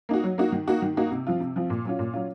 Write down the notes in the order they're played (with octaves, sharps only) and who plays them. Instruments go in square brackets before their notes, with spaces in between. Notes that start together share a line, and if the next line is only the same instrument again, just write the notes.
[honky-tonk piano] A#3 D#4 F#4
F#3
A#3 D#4 F#4
D#3
A#3 D#4 F#4
D#3
A#3 D#4 F#4
C3
F3 C4 F4
C3
F3 C4 F4
A#2
F#3 C#4 F4
A#2
F#3 C#4 F4